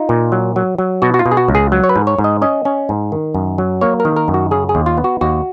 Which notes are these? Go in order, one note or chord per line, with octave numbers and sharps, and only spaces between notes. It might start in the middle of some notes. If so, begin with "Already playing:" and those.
Already playing: D#4 F4
A#2
F#3
F#3
F#3
B2 F#4
F#4
F4
B2
G#4
F#4
C#2
G#4
F#3
C#5
B4
G#2
C#5
G#2
D#5
C#4 D#5
C#4
G#2
D#3
F#2
F#3
A#3 C#5
A#4
D#3
A#4
F#2
F#4
C#3 G#4
G#4
D#2
F4
B3
F#4
D#2 F#4